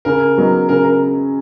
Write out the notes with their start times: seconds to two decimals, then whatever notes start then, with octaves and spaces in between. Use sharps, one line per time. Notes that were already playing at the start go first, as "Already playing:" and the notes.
0.05 C#3 A#4
0.38 F#3 B3 D#4
0.69 C#3 A#4
0.85 A#4